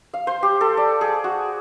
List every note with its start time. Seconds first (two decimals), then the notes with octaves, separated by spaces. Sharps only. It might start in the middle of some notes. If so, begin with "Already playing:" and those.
0.14 F5
0.27 C5
0.43 G4
0.61 A4
0.77 D5
1.01 G#4
1.24 F#4